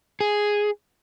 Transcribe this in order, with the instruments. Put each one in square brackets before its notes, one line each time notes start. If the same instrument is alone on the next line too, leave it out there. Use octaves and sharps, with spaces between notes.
[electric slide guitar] G#4